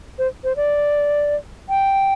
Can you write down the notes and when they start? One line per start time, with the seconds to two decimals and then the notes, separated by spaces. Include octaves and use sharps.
0.19 C5
0.44 C5
0.56 D5
1.69 G5